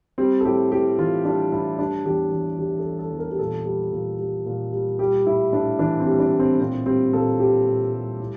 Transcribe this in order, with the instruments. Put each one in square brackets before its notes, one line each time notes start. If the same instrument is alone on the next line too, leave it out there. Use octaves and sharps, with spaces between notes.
[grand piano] G3 C4
A4
A2 G4
A2 G4
E3 F4
G3 D4
A2 E4
G3 D4
E2 G4
E2
E3 G4
A4
G3
A4
E2
A#4
G4
A#2 A4
G3
A#2
G3
A#2
G3
G3 G4
A2 E4
A2 D4
E3 D4
C4
G3
D4
A2
C4
A#2 C4
G3 C4
A#2 A4
G3 G4
A#2
G3
A2